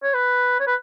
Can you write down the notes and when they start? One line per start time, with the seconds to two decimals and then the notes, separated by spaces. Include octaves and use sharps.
0.03 C#5
0.14 B4
0.60 C#5
0.67 B4